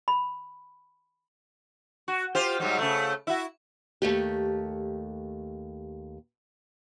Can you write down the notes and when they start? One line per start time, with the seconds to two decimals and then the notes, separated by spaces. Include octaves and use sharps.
0.08 B5
2.08 F#4
2.35 F4 G4 C5
2.60 G#2 F#3 G3
2.79 C#3 A3
3.27 E4 F#4
4.02 D#2 A3 G4